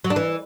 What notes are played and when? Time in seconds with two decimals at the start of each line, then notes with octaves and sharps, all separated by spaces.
0.04 F#3
0.10 D4
0.16 E3